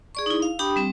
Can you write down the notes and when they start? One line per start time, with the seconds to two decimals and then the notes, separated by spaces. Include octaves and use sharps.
0.15 G#4 D5 C#6
0.26 D#4 E4
0.42 F5
0.59 D4 G4 G5 B5 D#6
0.76 G3 C4